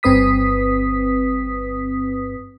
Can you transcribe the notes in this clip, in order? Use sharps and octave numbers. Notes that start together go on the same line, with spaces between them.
G1 G2 C4 B4 D#6 B6